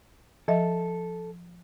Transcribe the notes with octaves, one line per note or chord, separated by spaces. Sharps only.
F3 A4 D#5 E5